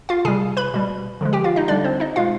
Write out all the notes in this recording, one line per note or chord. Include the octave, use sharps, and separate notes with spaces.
F4 F5
C3 G3 G#4 G#5
B4 B5
B2 G3
D3 F3 G#3
G4 G5
F4 F5
D#4 D#5
D3 G3 D4 D5
C4 C5
D#4 D#5
B2 G#3 F4 F5